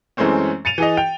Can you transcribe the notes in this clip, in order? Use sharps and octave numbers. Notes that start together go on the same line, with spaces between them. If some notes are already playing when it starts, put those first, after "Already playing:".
F#2 E3 G#3 A3 C4 C#4
A6 C#7 D#7 F7
E3 G#4 D#5
G5 F7